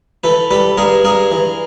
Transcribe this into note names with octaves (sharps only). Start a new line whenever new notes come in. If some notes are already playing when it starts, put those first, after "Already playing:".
E3 A4 B4
G3 A4 B4
G2 G#4 A#4
G2 G#4 A#4
E3